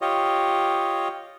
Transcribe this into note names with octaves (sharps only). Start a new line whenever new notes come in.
F4 G4 C#5 D#5